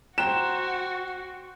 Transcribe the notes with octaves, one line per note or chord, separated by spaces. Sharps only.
F#4 C5 G5 A#5 F#6 E7